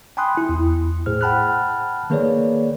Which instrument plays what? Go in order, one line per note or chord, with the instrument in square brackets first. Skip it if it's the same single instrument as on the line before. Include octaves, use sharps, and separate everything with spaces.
[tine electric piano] G5 G#5 B5 C6 D#6 F#6
E4
E2
A2 G#4 C5 F6
F#5 G5 A5 B5 F6 F#6
D#3 A#3 G#4 B4 C#5 D5